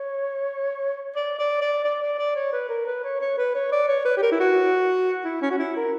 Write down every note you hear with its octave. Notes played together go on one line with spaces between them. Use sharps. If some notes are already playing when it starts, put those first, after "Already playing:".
Already playing: C#5
D5
D5
D5
D5
D5
D5
C#5
B4
A#4
B4
C#5
C#5
B4
C#5
D5
C#5
B4
G4
A#4
E4
F#4
E4
C#4
F#4
E4
A#4